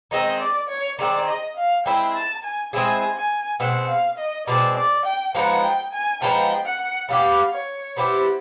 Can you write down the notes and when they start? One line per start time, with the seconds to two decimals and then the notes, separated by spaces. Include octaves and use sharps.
0.11 D#3 G#3 C4 D#5
0.41 D5
0.69 C#5
0.99 D#3 G#3 C4 D5
1.28 D#5
1.57 F5
1.86 G#3 C4 E4 G#4 G5
2.15 A5
2.44 G#5
2.73 G#3 C4 E4 G#4 G#5
3.17 G#5
3.60 B2 G#3 C4 F#5
3.89 F5
4.18 D#5
4.47 B2 G#3 C4 D5
4.77 D5
5.06 G5
5.35 F3 G#3 B3 D#4 F#5
5.64 G5
5.93 G#5
6.22 F3 G#3 B3 D#4 G5
6.65 F#5
7.09 G3 B3 E4 G4 F5
7.53 C#5
7.96 G3 B3 E4 G4 C5